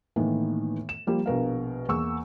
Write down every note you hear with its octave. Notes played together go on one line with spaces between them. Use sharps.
A2 D#3 E3 A#3 B3
E7
F3 G3 A#3
A#1 B2 A#4 F5
E2 A#3 C#6 E6